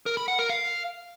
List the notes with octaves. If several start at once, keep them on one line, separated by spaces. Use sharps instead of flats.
A#4
B5
F#5
A#4
F5